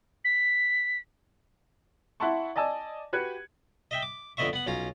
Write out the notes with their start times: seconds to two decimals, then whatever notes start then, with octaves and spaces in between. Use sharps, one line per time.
0.25 B6
2.20 E4 E5 F#5 A5 C6 C#6
2.56 D5 D#5 G#5 A5 E6
3.13 F#4 G4 B4 F#6 G#6 C#7
3.91 D#5 E5 G5
4.02 D6
4.37 F2 D3 B3 D#5 E5 C#6
4.53 B3 F#5
4.67 B1 C#4 F4 A#5